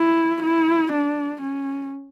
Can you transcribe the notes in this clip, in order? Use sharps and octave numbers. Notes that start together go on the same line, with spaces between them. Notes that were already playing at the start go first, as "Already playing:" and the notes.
Already playing: E4
E4
D4
C#4